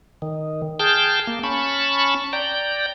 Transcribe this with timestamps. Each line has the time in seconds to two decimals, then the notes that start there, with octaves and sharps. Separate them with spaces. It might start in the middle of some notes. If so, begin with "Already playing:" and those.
0.22 D#3
0.80 G#4 G5 A5 F6 G6
1.27 A#3
1.43 C#4 A5 B5 C#6
2.33 D5 G5 A#5 G6